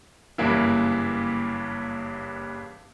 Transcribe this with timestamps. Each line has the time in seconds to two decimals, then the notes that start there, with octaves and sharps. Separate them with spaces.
0.38 F#1 G2 E3 A#3 E4